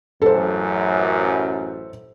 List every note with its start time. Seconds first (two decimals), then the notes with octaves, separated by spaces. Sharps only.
0.22 A1 F#2 A4 C5